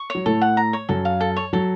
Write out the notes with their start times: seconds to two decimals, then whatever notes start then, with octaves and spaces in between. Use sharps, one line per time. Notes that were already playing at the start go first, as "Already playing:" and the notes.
Already playing: C#6
0.10 F#3 C#5
0.26 A2 A3 A4
0.42 F#5
0.57 A#5
0.73 C#5
0.89 F#2 F#3 A4
1.05 F5
1.21 A4
1.36 C#5
1.53 F#3 A4